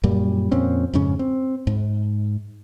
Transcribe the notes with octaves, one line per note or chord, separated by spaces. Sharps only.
F#2 A#2 G3
F2 A#2 C4 C#4
F2 G#2 C#3 C#4
C4
G#2